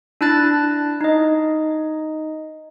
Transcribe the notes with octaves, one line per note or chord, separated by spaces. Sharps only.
D4 E4 A5 F#6 A6
D#4 D#5